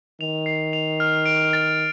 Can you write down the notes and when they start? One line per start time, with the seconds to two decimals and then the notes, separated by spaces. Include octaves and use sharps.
0.20 D#3 F7
0.46 C7
0.73 F7
1.00 F6
1.26 D7
1.53 A6